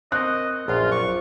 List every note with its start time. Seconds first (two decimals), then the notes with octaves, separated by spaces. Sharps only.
0.12 C4 A#4 D#5 C#6 F#6
0.68 A#1 F#2 F3 F4 C6
0.91 D5 C#6 D6